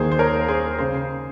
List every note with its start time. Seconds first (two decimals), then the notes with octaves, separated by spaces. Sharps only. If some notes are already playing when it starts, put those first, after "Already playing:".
Already playing: D#2 D#3 G#4 C5
0.12 C5
0.19 A#4 C#5
0.48 G#4 C5
0.78 C#3 G#4 C5